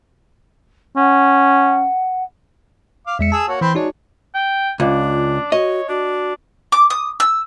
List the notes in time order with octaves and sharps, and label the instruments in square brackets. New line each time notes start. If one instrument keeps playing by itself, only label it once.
[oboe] C#4 [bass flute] F#5
[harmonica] F5 D6
[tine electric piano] E2 G#3 C#7 [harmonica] E5
[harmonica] G#4 E6 [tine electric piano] A5
[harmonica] A#3 F#4 C#5
[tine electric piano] E3 [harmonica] C4 B5 C6
[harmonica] G#3 D4 C#5 [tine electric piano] D#4 F#4 D5
[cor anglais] G5
[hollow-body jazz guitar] C#2 [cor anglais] D4 [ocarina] F4
[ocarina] F#4 [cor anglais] C#5 [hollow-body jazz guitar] D#5
[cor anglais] D4 [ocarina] F#4
[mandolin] D6
D#6
E6